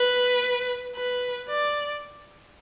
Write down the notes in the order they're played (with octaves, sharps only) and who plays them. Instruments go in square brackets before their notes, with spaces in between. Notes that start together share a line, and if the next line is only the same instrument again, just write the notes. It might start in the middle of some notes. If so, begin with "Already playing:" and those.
Already playing: [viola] B4
B4
D5